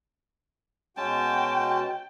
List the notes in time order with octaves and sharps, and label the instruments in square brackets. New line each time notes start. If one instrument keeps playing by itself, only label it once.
[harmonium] B2 F#4 [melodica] G#3 C#4 A5 [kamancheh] G5